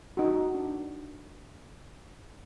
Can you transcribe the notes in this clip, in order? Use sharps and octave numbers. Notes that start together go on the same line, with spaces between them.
D#4 F#4
D4